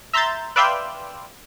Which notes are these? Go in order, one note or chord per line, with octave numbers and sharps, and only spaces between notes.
E5 A#5 C6 E6 G6 A6
B4 D5 E5 F5 G5 C6